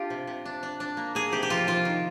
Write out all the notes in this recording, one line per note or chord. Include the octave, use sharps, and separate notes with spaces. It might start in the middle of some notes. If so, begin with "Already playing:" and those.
Already playing: D4 F4 G4
C3
C3
D4
D4
D4
A#3
A#3 G#4
C3 G4
G4
F3 F4
F3 F4
D#3